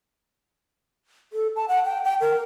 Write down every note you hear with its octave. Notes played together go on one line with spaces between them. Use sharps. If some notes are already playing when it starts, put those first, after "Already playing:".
A4
A5
F#5
G5
G5
A#4